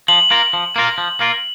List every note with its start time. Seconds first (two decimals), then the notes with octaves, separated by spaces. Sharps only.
0.08 F3 F#7
0.30 A#3 F4 A#4
0.53 F3
0.76 A#3 F4 A#4
0.98 F3
1.20 A#3 F4 A#4